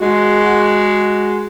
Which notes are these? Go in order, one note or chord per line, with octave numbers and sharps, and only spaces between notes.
G#3 F#4